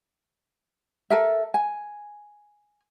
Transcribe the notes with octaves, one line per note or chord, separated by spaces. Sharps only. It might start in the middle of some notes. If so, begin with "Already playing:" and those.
A4 A#4 E5
G#5